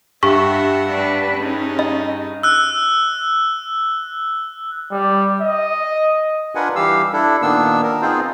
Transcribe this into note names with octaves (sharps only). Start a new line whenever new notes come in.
G2 E5 F#5 C#6
D4 B4
C#4 D#4 G#4
D#5
E6 F#6
G3
D#5
D4 F4 A#4 B4 F#5 G#5
E3 G3 G4 F5 E6
D4 E4 A4
A#2 D#3 A#3 B3 D4 E6
A#4
B3 C4 D#4 F4 G#4 C5